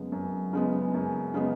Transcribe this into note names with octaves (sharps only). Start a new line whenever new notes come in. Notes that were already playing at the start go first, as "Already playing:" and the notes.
Already playing: F#2 C#3 G#3 B3
F#2
C#3 G#3 B3
F#2
C#3 G#3 B3